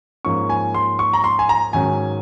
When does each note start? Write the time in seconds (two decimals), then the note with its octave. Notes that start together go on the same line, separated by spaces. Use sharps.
0.25 G#2 F3 A#3 C#4 C#6
0.49 G#5
0.74 C6
0.99 C#6
1.13 A#5
1.24 C6
1.39 G#5
1.49 A#5
1.73 G#2 D#3 F#3 C#4 G#5